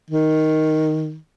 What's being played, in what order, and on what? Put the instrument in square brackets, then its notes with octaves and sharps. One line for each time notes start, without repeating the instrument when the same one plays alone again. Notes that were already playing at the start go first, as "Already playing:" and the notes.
[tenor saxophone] D#3